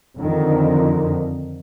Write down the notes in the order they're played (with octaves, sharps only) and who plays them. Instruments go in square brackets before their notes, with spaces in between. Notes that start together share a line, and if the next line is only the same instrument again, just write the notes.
[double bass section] F2 D3 D#3